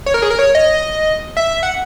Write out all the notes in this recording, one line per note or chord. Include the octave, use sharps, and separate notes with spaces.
C#5
A#4
G#4
A#4
C#5
D#5
E5
F#5